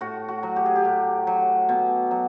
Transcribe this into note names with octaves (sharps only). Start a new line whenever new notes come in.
A2 F#4
F#4
F#3
G4
G#4
G4
A2
F#3
B2
F#3